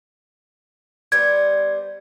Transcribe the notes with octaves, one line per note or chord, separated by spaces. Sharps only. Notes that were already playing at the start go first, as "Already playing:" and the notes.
G3 B3 C4 G#6